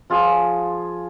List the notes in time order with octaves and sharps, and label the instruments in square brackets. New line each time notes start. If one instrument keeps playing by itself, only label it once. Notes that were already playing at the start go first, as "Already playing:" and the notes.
[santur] F3 F4 G#4